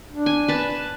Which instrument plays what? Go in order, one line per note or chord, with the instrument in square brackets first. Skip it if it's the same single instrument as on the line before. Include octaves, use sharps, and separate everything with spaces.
[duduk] D4
[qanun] G#5
B4 A5